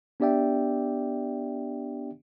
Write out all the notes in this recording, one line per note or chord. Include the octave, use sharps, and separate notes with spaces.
B3 D4 G4 D5 E5 G5